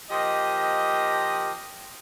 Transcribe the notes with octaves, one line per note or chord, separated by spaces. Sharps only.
F3 A#3 G4 D#5